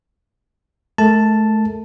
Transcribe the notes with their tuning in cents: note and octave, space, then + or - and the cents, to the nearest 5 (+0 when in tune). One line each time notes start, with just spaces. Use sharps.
A3 -30 A#4 -35 A5 +0